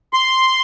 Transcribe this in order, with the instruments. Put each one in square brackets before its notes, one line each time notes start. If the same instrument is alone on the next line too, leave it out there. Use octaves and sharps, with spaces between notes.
[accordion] C6